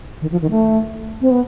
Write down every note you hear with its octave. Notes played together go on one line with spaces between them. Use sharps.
D#3
F3
D#3
A3
C4
B3